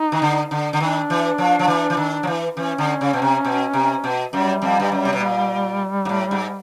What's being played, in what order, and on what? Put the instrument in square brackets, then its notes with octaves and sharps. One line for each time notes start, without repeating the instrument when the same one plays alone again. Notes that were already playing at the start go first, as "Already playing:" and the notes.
Already playing: [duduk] D#4
[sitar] D#3
D3
D3
D3
[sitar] D#3 [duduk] D4
[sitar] E3
F3
F3
E3
E3
D#3
F3
E3
[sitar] E3 [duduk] C#4
[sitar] D3
C#3
B2
C3
B2
C3
B2
[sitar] F#2 [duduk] G3
[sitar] F2
G2
F#2
C3
B2
A#2
G#2
A2
G#2